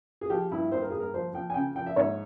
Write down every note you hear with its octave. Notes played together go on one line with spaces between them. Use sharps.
G#4
F3 G4
G2 E4
G2 C5
A#4
G2 G#4
A#4
F3 C5
F3 G5
G#5
C#3 G5
F3 G5
E5
G#2 C#5